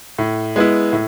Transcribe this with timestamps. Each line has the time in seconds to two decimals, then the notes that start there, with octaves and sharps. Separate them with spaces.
0.19 A2
0.56 G#3 B3 E4
0.93 A2